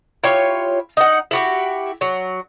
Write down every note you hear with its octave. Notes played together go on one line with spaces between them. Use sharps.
E4 F4 G4 C#5
D#4 F#5
E4 F#4 G4
F#3